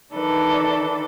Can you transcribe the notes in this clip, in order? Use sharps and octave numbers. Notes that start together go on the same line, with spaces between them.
D#3 E3 D4 A4 B4